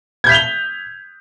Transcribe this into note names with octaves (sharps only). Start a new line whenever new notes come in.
G6 G#6 B6 F7 G7